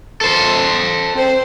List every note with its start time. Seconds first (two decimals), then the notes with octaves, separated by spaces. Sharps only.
0.21 A4 C5
1.14 C4 C5